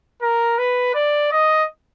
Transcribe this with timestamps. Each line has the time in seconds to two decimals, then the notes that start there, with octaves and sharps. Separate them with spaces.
0.22 A#4
0.58 B4
0.95 D5
1.32 D#5